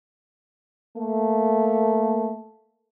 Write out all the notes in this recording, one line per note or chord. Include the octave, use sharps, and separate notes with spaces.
A3 A#3